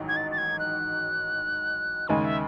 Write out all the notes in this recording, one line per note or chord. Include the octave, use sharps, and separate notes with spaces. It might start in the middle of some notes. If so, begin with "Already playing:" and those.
Already playing: A1 G#2 D#3 F#3
G#6
A6
A6
G#6
F#6
D#2 C#3 G#3 D#4 G#5
E5